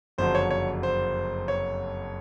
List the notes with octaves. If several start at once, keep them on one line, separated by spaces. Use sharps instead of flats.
F#1 F2 D3 F#3 C5
C#5
C#5
C5
C#5